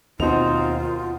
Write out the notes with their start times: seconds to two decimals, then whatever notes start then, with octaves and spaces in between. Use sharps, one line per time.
0.20 D#2 B2 C4 D#4 F4 F7